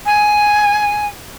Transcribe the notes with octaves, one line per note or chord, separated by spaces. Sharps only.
G#5